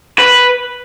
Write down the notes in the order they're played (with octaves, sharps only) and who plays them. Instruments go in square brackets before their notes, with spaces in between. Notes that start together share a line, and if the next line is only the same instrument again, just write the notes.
[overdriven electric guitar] B4